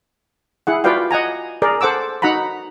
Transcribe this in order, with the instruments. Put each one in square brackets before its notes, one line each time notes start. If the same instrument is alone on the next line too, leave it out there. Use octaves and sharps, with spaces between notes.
[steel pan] E4 G#4 F#5
F4 F#4 B4 D5 F5 G5
D#5 F#5 G#5 A#5
G#4 A#4 D5
A4 C5 F#5 D6 E6
D#4 F#4 F#5 A#5 B5